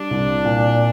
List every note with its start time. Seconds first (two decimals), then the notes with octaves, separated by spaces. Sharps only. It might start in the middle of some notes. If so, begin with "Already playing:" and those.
Already playing: G3 D4
0.11 C2
0.45 A#2